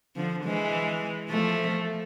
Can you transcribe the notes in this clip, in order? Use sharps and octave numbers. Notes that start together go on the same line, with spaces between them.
D3 F3
E3 G#3
F3 A3